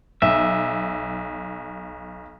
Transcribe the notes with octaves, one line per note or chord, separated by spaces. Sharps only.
B1 E5